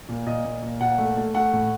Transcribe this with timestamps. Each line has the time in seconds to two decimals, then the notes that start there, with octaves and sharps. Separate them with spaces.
0.09 A#2
0.26 A#2 D#5
0.44 A#2
0.63 A#2
0.80 A#2 F#5
0.98 A3
1.17 A3
1.34 A3 F#5
1.53 A2